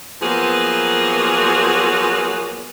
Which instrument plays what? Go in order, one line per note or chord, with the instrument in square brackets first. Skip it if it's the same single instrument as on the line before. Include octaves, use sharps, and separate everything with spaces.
[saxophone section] F3 F#3 A#3 B3 G#4